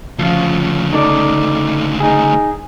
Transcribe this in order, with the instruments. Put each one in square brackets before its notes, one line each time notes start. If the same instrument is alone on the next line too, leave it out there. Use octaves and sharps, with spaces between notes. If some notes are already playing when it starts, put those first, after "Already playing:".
[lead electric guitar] D2 C#3 [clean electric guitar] F3 F4
[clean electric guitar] D#4 A4 D5
D#4 G#4